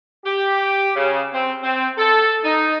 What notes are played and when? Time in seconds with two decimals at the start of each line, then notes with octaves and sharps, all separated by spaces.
0.25 G4
0.96 C#3
1.33 C4
1.63 C4
1.98 A4
2.44 D#4